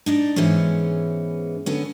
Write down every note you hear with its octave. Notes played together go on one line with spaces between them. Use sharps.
D4 D#4 D5
G#2 E3 G#3 B3 C#4
D3 B3 C#4